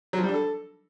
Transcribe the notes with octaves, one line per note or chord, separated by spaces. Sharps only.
F#3
F3
G3
D4
A4